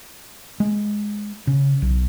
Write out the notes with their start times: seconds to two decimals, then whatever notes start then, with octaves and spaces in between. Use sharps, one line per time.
0.60 G#3
1.47 C#3
1.82 B1